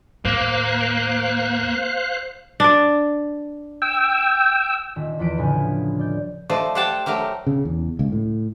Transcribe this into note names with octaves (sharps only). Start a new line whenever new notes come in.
D#2 A2 A#3 C5 F5 F#6
D4 D5
G5 E6
D#1
E2 F3 B4 D7 E7
F1 D2 A2 C#3 G#5
D5 G6
F3 A3 C5 D5 D#5
G4 C5 F#5 G5 A5
F#3 A3 G4 A#4
C#3
E2
C#2
A2